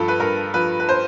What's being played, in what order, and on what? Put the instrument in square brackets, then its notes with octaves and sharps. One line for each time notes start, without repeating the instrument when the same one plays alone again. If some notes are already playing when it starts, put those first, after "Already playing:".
Already playing: [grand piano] G2 F3 A4
B4
G2 A#4
F3 B4
B4
C5